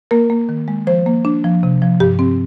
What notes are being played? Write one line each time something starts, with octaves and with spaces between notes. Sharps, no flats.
A#3 A#4
A#3
D#3
G#3
F3 C5
A#3
D4
F3
C3
F3
G2 G4
C4